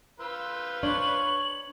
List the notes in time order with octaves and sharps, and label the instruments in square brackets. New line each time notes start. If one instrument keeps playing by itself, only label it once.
[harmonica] F4 B4 C5 [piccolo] E6
[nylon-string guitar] D4 [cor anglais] C#5 [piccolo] F#7